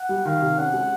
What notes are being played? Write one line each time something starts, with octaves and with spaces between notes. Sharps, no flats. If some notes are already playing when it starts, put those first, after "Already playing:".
Already playing: F#5
G3
D#3 F5
C3
C#4 F#5
G#3